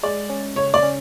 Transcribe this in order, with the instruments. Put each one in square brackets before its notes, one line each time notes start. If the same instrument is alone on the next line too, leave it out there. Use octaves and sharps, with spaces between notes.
[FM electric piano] G#3 [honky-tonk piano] D5
[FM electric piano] C#4
[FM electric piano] C#3 [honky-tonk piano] C#5
[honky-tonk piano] D5
[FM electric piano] C#4